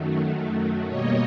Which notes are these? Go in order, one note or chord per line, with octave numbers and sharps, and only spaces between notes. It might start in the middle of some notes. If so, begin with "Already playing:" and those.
Already playing: F#2 D#3 F#3 A3
B2 G3 A#3 C#5 D#5